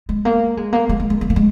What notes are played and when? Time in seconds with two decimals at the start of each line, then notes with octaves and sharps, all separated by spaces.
0.09 G#3
0.25 A#3
0.57 G#3
0.73 A#3
0.89 G#3
1.00 G#3
1.10 G#3
1.21 G#3
1.30 A#3
1.36 G#3